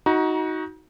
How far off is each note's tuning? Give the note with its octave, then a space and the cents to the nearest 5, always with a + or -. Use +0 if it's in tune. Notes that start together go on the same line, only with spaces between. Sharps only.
D#4 +20 F#4 +0 A#5 +35